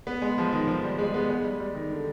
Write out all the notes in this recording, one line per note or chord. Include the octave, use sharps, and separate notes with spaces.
B3
G#3
F3
D#3
F3
G3
G#3
B3
G#3
G3
G3
D#3
D3